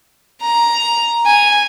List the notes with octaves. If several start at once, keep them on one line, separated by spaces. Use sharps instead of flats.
A#5
G#5